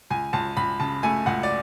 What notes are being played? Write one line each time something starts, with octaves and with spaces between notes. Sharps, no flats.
C#2 G#5
C#2 A5
C#2 B5
C#3 A5
A3 G#5
C#2 F#5
D5